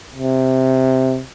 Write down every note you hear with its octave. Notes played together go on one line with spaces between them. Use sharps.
C3